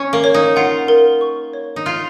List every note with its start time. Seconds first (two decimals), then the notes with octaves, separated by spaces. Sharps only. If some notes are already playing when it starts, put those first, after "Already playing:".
Already playing: C#4 C#6
0.13 A#3
0.24 C#5
0.34 D#4
0.56 F4 F#5
0.88 A#4
1.21 C#6
1.53 C#5
1.76 D#4
1.86 F4 F6